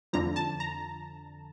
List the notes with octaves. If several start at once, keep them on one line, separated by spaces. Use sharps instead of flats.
F2 D3 F3 A#5
A5
A#5